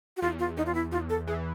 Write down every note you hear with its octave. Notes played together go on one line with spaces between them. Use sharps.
F#4
E2 F4
F4
E2 D#4
F4
E4
E2 F4
A4
E3 G#4